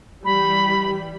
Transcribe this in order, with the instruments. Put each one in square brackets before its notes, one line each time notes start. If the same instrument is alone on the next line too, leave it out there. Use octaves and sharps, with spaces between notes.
[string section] E3 G3 [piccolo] B5